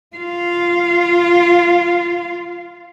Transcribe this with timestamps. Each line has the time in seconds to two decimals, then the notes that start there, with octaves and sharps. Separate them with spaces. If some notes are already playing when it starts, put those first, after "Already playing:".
0.16 F4 F5